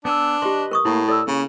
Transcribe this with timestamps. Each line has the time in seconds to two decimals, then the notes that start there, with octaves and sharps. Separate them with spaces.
0.05 B3 D4 G#5 E6
0.42 G4 B4 D#5 C6
0.71 A#4 C#6 D#6
0.85 A2 A#3 E4
1.08 A4 D5 E6
1.27 C#3 A#3 C#4